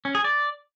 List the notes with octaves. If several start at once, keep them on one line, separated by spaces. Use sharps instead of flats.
C#4
G#4
D5